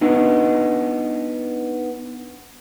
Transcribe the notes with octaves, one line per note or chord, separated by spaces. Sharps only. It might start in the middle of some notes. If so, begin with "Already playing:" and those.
B3 D4 D#4